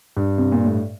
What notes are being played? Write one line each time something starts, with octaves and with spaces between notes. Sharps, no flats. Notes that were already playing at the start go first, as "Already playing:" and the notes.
G2
C3
A#2
A2